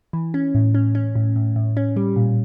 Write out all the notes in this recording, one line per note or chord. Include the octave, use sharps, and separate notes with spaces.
E3
C#4
A2
C#4
C#4
A2
A2
A2
C#4
G3
A#2